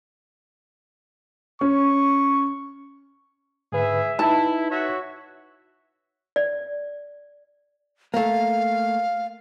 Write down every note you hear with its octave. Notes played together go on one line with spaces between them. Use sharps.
C#4 C#6
G#2 D3 G#4 B4 E5
D#4 E4 B4 A5
F#4 C#5 E5
D5
A3 A#3 F5